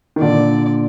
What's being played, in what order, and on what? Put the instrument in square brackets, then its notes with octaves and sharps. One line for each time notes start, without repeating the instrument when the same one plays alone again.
[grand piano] D#3
[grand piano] A#2 D3 [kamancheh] D5